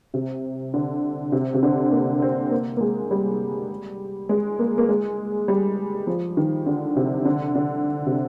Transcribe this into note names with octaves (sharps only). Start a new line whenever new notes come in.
C3
D3
C3
C3
D3
A#3
C4
A#3
A#3
G#3
G3
G#3
A#3
A#3
G#3
G3
F3
D#3
D3
C3
D3
D3
C3